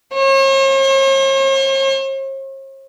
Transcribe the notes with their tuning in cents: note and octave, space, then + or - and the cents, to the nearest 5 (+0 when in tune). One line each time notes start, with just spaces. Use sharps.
C#5 -45